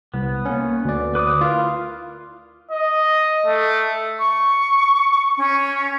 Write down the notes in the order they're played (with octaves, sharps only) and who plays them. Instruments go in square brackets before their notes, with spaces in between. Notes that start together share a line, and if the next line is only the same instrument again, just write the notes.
[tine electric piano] C2 [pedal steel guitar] B3
[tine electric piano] A#3 C#4
D2 D5
[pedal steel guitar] B4 D6 D#6
[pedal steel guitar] E4 A#4 F5 [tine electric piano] F4
[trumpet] D#5
A3
[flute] C#6
C#4